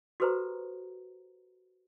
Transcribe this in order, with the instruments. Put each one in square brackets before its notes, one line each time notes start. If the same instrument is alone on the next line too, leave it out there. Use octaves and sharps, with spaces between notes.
[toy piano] F#4 G4 A4 B4 C5 A#5